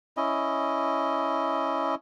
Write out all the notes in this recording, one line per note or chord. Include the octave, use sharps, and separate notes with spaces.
C#4 E4 D#5